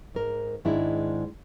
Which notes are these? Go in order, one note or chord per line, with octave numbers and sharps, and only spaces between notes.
G#2 A#4
G#2 D#3 G#3 D4 E4